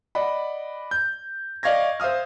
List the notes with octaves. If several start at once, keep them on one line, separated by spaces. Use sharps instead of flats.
D5 D#5 F#5 B5
G6
D5 D#5 F5 C#6 G#6 A#6
C5 E5 F5 D#6 F6